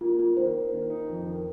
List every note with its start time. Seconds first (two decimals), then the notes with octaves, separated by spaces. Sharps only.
0.01 A#3 F4
0.19 A#3 F4
0.37 D#3 C5
0.54 A#3
0.73 D#3
0.90 D#4
1.08 F2
1.26 D#3